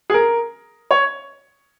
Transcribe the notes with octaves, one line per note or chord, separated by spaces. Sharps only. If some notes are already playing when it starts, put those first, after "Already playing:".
G#4
A#4
C#5